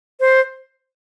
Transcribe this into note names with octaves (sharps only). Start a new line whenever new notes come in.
C5